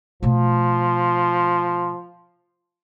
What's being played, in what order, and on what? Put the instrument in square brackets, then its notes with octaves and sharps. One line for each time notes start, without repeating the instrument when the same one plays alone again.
[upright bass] B2 A3 [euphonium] F3